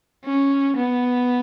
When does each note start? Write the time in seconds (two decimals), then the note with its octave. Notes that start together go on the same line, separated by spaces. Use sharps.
0.24 C#4
0.77 B3